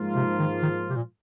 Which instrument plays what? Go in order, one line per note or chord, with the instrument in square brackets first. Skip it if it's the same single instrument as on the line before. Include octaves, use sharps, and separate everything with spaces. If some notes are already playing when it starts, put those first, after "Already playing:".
Already playing: [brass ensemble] G#2 F3 A#3 F4
[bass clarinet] C3
D#3
D#3
C3
A#2